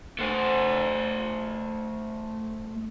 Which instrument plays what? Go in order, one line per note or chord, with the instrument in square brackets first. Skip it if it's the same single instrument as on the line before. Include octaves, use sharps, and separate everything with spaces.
[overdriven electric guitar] A3 C5